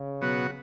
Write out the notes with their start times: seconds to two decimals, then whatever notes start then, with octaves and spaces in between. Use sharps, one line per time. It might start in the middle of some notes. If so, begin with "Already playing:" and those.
Already playing: C#3
0.21 B2 F#3 B3 F#4